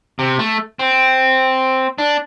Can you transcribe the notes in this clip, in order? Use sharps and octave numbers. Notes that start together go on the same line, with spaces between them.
C3
A3
C4
D4